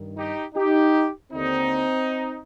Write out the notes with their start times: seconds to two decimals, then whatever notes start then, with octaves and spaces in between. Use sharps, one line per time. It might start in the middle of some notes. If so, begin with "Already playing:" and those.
Already playing: G2 D#3
0.17 D#4 G4
0.55 D#4 G4
1.32 D#2 D3 C4 D#4